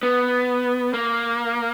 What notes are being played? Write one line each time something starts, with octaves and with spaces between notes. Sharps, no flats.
B3
A#3